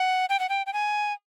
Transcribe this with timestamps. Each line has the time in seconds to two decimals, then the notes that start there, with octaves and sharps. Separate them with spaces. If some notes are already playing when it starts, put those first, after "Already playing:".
Already playing: F#5
0.29 G5
0.39 F#5
0.49 G5
0.66 G5
0.73 G#5